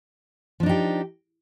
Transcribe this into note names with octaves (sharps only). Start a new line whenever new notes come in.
F3 D4 D#4 G4